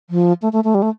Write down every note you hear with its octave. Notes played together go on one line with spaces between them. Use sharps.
F3
A3
A3
A3
G3
A3